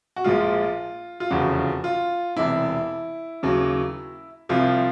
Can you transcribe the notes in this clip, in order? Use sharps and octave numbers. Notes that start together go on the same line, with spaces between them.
F#4
A#1 A#2 F3 G#3 F4
F4
F1 E2 C#3 F3 F#4
F4
E1 E2 C3 E4
D#2 C#3 F#3
C2 C3 F3 F4